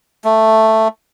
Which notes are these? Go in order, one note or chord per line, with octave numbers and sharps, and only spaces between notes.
A3